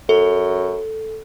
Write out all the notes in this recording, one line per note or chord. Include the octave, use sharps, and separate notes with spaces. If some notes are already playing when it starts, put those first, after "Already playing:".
F#2 A4